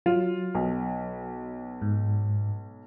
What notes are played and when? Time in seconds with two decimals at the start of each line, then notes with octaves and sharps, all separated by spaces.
0.06 F#3 F4
0.55 B1
1.82 G#2